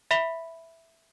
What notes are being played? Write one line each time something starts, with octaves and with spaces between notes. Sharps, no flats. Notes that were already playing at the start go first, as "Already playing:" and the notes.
E5 B5 B6 F7 G7